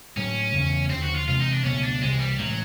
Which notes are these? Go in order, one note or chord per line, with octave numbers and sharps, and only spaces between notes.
A2 F#3 A#3 C#4
E2 C#3 E3 A3
D#2 D3 F3 C4
F#4
F4
C3 E3 G#3 F4
D#4
D4
C#2 B2 F#3 A3 C#4
D4
C2 C3 E3 G#3
G3
A2 E3 F#3 G#3